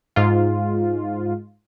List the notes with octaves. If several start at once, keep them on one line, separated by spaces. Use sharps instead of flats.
G#2 F4